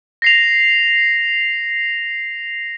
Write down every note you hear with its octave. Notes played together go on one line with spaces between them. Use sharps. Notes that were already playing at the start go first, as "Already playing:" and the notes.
A#6 C7 F7